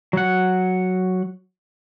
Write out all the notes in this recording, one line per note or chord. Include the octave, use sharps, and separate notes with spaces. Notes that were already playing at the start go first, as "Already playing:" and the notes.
F#3 F#5